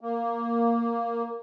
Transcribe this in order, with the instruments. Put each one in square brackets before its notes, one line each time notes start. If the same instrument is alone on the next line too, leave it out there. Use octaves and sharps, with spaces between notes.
[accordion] A#3